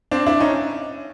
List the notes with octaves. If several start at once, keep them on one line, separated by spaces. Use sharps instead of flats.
C4 D4
D4 E4
C#4 D#4